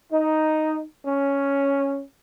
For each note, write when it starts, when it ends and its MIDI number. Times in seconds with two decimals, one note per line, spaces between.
0.11 0.81 63
1.05 2.01 61